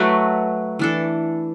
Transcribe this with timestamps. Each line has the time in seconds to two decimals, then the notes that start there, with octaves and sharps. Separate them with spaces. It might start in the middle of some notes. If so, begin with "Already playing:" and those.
Already playing: F#3 A3 F#4 B4
0.79 E3 D4 A4